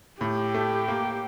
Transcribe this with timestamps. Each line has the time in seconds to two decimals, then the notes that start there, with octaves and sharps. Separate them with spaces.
0.21 A2 G4
0.55 A3
0.88 A#3